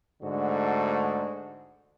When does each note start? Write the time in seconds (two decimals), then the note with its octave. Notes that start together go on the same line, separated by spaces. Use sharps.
0.23 G#2 D3 A3 F#4